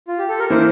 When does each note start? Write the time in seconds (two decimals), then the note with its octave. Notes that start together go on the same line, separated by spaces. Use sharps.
0.08 F4
0.18 G4
0.29 A4
0.39 A#4
0.50 E3 A#3 E4 A#4 C5